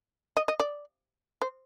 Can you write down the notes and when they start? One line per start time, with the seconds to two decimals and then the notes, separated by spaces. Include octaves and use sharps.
0.37 D#5
0.48 D#5
0.60 D5
1.42 C5